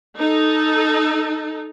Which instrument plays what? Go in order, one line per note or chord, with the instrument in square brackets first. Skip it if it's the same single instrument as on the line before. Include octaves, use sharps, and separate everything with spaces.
[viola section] D#4 A4